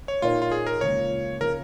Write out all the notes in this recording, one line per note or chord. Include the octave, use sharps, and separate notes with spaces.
C#5
A#2 A#3 D#4 F4 A#4 C#5
F4
G#4
A#4
C#2 C#3 F3 A#3 C#5
C#3 F3 C#4 A#4